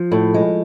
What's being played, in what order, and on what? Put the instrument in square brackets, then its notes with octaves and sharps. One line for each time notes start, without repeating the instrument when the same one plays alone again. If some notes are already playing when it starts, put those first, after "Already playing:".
Already playing: [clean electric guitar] F3
[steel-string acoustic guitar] A2
G#3